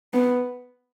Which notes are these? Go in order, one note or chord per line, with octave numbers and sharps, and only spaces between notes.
B3